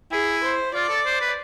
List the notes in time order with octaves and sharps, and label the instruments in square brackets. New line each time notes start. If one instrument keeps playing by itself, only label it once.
[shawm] E4 [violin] G#4
[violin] C5
[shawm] F4 [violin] D5
[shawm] A4
C5
B4